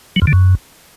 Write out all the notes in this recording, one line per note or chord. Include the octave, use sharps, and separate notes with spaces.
F#3
F2
D3
F#2